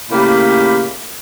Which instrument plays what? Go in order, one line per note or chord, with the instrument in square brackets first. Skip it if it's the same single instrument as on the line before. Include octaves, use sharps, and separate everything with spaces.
[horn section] A2 C#3 A#3 G4 B5